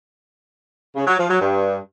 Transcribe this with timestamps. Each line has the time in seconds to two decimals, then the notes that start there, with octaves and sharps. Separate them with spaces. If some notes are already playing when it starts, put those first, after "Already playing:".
0.96 C#3
1.07 F#3
1.18 F3
1.29 F#3
1.41 G2